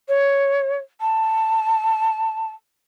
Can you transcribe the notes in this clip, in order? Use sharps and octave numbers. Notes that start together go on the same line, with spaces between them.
C#5
A5